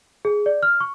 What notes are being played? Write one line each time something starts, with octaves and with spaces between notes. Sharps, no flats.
G#4
D5
F6
C#6